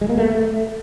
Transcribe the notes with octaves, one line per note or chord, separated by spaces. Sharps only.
G#3
A#3
A3